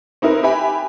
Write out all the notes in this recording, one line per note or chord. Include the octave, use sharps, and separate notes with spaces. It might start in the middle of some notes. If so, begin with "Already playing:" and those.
C4 D#4 E4 A#4 B4
G4 B4 E5 G5 G#5 B5